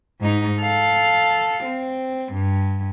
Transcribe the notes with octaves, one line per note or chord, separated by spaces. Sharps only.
G#2 D#4
A4 F5
C4
G2